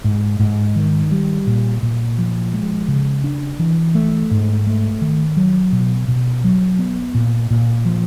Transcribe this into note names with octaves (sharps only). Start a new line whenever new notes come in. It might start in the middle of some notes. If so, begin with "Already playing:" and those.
G#2
G#2
D#3
G3
A#2
A#2
F3
G#3
C#3
D4
E3
A3
G#2
A3
D#3
F#3
B2
B2
F#3
B3
A#2
A#2
F3